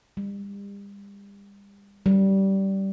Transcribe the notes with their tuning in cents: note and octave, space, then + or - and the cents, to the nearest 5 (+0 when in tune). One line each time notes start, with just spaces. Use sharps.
G3 +40
G3 -20